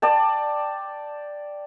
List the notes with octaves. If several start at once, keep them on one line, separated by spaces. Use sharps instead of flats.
D5 G5 A5